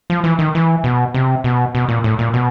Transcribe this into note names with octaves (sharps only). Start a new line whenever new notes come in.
F3
E3
D#3
E3
B2
C3
B2
B2
A#2
A2
A#2
B2